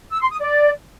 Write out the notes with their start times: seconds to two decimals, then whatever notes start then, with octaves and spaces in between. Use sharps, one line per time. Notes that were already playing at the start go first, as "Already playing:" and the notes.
0.11 E6
0.21 C6
0.30 D#6
0.40 D5